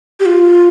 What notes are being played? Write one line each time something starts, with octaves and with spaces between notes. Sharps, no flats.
G4
F4